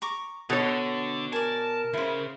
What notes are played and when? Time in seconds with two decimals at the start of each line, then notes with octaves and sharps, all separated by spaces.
0.02 A#5 C#6 D6
0.50 B2 D3 A4 C#5
1.33 A#4 D5 G#5 A5
1.93 D2 C#3 E4 C5